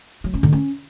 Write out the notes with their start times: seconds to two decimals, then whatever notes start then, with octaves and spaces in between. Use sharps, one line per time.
0.24 F#3
0.34 C#4
0.43 D3
0.53 C#4